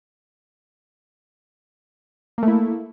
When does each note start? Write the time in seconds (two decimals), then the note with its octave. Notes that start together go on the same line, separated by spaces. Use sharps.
2.38 A#3
2.43 A3
2.48 E4